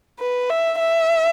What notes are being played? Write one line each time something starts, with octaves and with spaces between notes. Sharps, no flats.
B4
E5
E5